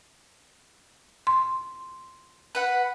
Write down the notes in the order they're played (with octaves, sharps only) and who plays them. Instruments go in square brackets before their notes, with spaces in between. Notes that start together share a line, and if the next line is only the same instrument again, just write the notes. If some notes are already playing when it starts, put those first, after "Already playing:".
[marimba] C6
[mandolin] B4 F#5